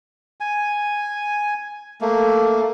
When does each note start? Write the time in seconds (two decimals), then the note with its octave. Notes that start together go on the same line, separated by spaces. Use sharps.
0.40 G#5
2.01 A3 A#3